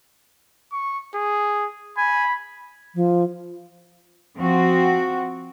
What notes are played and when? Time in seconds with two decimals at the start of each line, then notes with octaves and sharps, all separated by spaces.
0.72 C#6
1.15 G#4
1.97 G#5 B5
2.95 F3
4.37 F3 C4 F#4